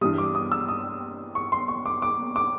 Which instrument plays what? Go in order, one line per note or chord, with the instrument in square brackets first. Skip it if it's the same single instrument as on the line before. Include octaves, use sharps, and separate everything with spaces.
[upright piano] G2 E3 G3 D#6
D6
D#6
E6
D#6
C#6
C6
C#6
D6
D6
D6